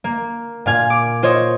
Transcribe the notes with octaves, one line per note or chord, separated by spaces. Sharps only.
A#3
A#2 F5 G#5
D6
F4 C5 C#5 D#5